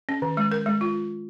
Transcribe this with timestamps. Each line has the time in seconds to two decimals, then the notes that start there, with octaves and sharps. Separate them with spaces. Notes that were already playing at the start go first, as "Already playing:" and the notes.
0.09 C#4
0.22 D#3
0.37 G#3
0.52 A#4
0.66 G#3
0.81 F4